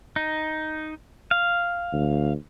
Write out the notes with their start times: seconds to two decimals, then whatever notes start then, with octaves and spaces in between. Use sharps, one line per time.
0.16 D#4
1.31 F5
1.93 D2